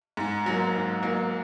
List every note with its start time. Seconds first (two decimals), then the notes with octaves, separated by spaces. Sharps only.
0.17 G#2
0.46 F#3 A#3
0.74 G#2
1.03 F#3 A#3